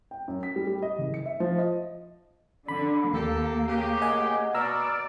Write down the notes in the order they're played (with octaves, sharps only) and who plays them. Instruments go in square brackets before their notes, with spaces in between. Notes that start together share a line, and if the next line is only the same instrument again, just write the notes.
[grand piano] G5
F#2
B6
G3
G3
D#5
F#1
C#7
E5
F3
D#5
[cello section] D3 [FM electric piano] B5
[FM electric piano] D#2 [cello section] A#3 [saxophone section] G4 A4
[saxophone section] C#3 G4
[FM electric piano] D#5 F#5 G#5
[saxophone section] B2 [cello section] D5 [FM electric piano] A#5 E6 F6